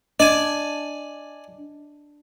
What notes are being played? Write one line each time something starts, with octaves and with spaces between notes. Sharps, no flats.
D4 D5 D#5 G#5